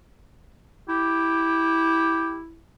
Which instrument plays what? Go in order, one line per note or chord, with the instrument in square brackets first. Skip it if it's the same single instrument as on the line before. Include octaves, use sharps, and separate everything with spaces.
[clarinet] E4 [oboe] G4